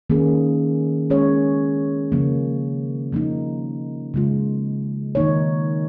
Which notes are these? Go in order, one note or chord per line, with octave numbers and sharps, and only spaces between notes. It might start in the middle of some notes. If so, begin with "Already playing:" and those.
D#3 A#3 C#4 G#4
G#3 C#4 G#4 C#5
C#3 F3 A#3
F3 A#3 D#4
C#3 G#3 F4
D#3 A#3 D#4 C#5